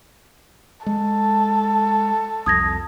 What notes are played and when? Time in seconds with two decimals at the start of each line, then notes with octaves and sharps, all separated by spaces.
0.86 G#3 A4
2.46 C2 F2 D#6 G#6 A#6